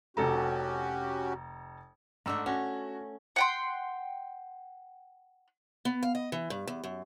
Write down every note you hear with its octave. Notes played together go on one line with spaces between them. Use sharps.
F1 C#4 F#4 G4 A4 A#5
G#2 A3 D4 F#4 E6
C#4 F#4
F#5 G5 C6
B3
F5
D#5
E3
G2
E2
F#2